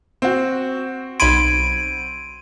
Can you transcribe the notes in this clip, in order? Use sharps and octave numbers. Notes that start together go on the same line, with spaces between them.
C4 F#4
B1 B5 C6 G#6 D7 D#7